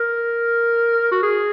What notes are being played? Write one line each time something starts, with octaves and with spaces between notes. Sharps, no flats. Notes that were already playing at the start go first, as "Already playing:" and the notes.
Already playing: A#4
F#4
G#4